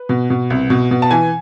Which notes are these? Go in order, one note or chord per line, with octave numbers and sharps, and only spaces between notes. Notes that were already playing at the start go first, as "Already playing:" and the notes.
Already playing: B4
B2
B2
C2
B2
B2
A5
E3 G#5